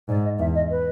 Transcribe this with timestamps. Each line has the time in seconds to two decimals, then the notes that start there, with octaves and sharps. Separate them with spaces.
0.09 G#2 D5
0.24 D#5
0.39 E2 E5
0.55 D#5
0.70 B4